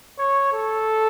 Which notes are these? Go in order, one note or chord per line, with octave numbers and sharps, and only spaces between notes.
C#5
A4